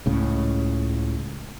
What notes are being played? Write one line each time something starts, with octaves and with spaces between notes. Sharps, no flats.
C#2 A2 C#3